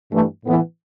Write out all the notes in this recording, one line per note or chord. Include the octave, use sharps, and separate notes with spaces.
G2 E3 A3
A2 E3 B3